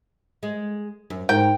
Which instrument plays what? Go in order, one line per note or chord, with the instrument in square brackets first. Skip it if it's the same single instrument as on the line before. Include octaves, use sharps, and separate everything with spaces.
[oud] G#3
F#2
[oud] G#2 A#4 [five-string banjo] G5